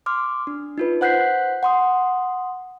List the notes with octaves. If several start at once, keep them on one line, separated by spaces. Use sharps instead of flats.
C6 D6 F6
D4
D#4 F4 B4
C5 F#5 F#6 G6 B6 C7
F#5 C6 D#6